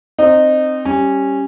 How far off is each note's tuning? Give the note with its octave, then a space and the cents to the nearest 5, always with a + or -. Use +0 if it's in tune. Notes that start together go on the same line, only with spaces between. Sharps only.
C4 +5 D#4 -20
G3 +0 C#4 -15